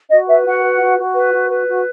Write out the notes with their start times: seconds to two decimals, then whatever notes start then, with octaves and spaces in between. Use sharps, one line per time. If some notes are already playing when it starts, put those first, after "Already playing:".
0.10 F#4 D#5
0.28 B4 E5
0.45 F#4 F#5
0.62 B4
0.80 F#4
0.97 F#4
1.14 B4
1.32 F#4
1.49 B4
1.67 F#4